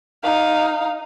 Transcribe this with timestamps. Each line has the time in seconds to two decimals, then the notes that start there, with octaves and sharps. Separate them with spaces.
0.23 D#4 F5